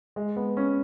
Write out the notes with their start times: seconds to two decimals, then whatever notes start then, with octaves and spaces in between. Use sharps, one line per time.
0.16 G#3
0.36 B3
0.57 C#4